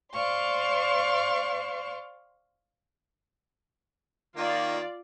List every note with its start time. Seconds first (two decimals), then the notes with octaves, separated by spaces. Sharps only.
0.13 C5 D5 F5 C6 C#6
4.37 D#3 A#3 D#4 F4 D5 F5